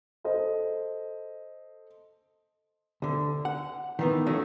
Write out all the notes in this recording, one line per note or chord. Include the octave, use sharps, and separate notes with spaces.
A4 C5 D#5
D2 D3
F#5
D#3 E3 B3
F#3 A3 C#4